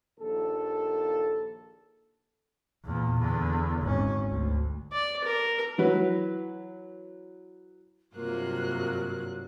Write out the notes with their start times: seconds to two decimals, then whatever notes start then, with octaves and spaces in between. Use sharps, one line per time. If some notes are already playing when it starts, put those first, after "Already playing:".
0.19 A#1 D#2 A4
2.85 E2 A#2
3.20 E2 D3
3.82 G#1 C#4
4.30 D2
4.92 D5
5.24 A#4
5.78 E3 F#3 B4
8.16 G2 C3 F#3 A#3 F4 A#4 F#6